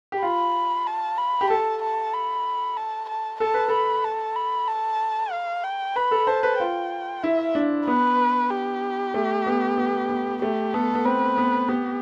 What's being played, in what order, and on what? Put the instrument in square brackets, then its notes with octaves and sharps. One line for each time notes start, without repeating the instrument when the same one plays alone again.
[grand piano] G4
[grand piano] F4 [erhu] B5
[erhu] A5
B5
[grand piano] G4
[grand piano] A4 [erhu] A5
[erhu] A5
B5
A5
A5
[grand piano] A4 [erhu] A5
[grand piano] B4
[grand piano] A4 [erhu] B5
[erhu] A5
B5
A5
F5
G5
[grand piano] B4 [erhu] B5
[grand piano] A4
[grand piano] C5 [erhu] A5
[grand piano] B4
[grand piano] F4 [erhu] G5
[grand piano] E4 [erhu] E5
[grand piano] D4
[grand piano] B3 [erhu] B4
[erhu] G4
[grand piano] A3
B3
B3
B3
[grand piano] A3 [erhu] G4
[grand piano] B3 [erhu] A4
[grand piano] B3
[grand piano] C4 [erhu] B4
[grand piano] B3
[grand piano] B3 [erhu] G4